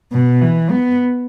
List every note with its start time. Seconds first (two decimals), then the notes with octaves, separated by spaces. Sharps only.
0.13 B2
0.41 E3
0.70 B3